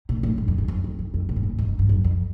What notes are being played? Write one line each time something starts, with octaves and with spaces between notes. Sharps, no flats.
A#2
A2
G2
F2
E2
F2
F2
F2
F2
A2
G#2
A2
G#2
G#2
G2
F#2
F2